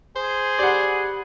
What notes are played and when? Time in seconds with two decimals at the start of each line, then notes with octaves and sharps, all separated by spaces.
0.16 G#4 C5
0.59 G4 D5 F#5 B5